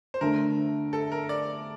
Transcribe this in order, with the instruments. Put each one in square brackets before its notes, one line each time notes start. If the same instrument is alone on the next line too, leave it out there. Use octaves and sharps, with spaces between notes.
[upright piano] C5
[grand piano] D3 A3 D4 [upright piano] A#4
[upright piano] A4
A#4
D5